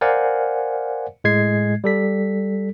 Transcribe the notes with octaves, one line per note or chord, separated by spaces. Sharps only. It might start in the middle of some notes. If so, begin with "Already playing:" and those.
A#4 C5 D5 F5 F#5 G#5
A2 G#3 G#6 C7
G3 A4 B6